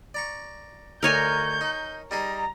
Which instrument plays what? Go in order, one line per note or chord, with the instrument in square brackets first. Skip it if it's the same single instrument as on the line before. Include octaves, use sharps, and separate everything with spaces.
[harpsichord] D5 A#5 C#6
[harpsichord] D2 D#4 [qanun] A#4 C#5 G#5 [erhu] G6
[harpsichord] D#4
[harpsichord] G3 D#4 G#4 [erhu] A#5